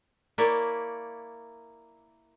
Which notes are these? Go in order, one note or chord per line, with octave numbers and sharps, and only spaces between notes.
A#3 E4 C#5 D5